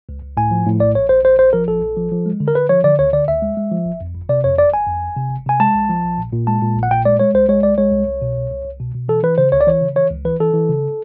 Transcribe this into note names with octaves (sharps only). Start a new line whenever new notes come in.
C#2
C#2
A2 G#5
F3
A2
A#1 D5
A#1 C#5
A#1 C5
A#1 C5
A#1 C5
F3 A#4
A#1 A4
A#1
F3
F3
G#3
D3
A#4
D3 B4
F3 C#5
D3 D5
D2 C#5
D3 D5
D2 E5
G#3
G#3
F3
G1
F2
G1
C3 D5
F2 C#5
G1 D5
G1 G#5
F2
G1
C3
G1
C3 G#5
G#3 A5
A#1
F3
A#1
A#2
A#2
G#3 A5
A#2
A#1
F#5
A#2 G5
G#3 D5
G#3 C#5
C2 C5
G#3 C#5
C2 D5
G#3 C#5
C2
C2
B2
C2
C2
C2
B2
B2
E3 A4
E3 B4
C#3 C5
C#2 C#5
D5
E3 C#5
C#3
E3 C#5
C#2
E3 B4
E3 A4
E3
C#3